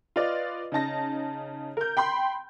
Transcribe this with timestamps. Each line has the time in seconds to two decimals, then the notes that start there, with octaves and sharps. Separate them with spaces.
0.16 F4 B4 D5 D#5
0.72 C#3 D#4 A5 A#6
1.77 A#4 G6
1.97 G5 B5 C6